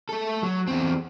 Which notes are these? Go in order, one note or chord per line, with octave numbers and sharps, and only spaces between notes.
A3 A4
F#3
E2 C4